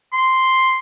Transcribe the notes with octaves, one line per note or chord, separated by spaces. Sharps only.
C6